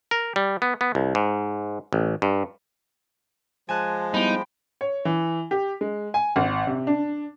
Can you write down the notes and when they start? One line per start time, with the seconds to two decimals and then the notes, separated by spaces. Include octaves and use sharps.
0.11 A#4
0.36 G3
0.62 B3
0.81 B3
0.95 C2
1.15 G#2
1.93 A1
2.22 G2
3.69 F3 G#3 G#5 A5 F#6
4.14 G3 B3 D#4 E4 G5 B5
4.81 C#5
5.05 E3
5.51 G4
5.81 G#3
6.14 G#5
6.36 G#1
6.67 C3
6.87 D4